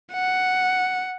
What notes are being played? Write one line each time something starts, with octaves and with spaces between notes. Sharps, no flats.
F#5